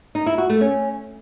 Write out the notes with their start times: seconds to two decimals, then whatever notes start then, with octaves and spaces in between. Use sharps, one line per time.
0.15 D#4
0.26 E4
0.38 F#4
0.49 A3
0.61 C#4